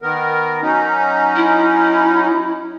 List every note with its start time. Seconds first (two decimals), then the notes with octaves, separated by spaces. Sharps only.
0.02 D#3 B3 A#4
0.62 F#3 C#4 D#4
1.36 E4